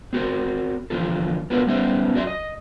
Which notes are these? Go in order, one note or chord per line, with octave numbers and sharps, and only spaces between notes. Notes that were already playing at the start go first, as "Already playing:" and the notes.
C4 F#4 A#4 C5
D3 E3 F3 A#3 F4 A4
B3 D4 F4 F#4 A#4 B4
G3 B3 C#4 D#4 C5 E5
F#2 F#4 D5 E5 C6
D#5